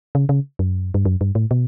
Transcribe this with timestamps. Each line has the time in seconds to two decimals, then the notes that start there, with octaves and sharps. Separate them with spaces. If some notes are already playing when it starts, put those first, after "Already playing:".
0.15 C#3
0.29 C#3
0.59 F#2
0.94 G2
1.05 F#2
1.21 G2
1.35 A2
1.51 B2